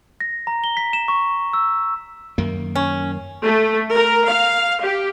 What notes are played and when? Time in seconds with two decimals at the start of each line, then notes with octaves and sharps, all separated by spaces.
0.21 A#6
0.47 A#5
0.64 G7
0.77 B6
0.93 E7
1.08 C#6
1.53 E6
2.38 F#2 D#3 A#3
2.76 C#4
3.43 A3
3.91 A#4
4.28 F5
4.82 G4